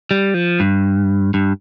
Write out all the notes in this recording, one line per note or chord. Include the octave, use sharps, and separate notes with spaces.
G3
F3
G2
G2